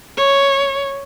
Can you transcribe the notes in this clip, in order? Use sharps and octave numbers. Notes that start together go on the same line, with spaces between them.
C#5